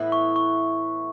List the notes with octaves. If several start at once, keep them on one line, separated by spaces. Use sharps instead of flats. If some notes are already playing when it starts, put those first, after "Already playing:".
Already playing: A2 E3 B3 E4
C#6
C#6